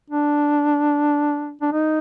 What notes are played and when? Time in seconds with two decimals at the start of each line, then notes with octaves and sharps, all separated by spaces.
0.10 D4
1.61 D4
1.73 D#4